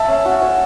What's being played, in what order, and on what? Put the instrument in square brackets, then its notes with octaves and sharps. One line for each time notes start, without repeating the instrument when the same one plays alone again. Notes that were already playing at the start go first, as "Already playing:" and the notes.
Already playing: [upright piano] E5 A5
[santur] C#4
F#4
C#5